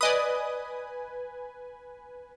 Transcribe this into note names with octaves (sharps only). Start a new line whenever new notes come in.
B4 D5 D#5 G#5 D#6